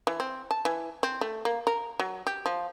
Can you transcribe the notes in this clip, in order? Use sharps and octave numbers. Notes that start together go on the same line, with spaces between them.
E3
C4
A5
E3
C4
A3
A#3
A#4
F#3
G4
F3